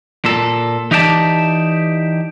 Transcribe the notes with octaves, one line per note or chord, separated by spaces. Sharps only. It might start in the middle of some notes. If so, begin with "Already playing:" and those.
A#2 A4
E3 D#4 G4 D5 F5 A5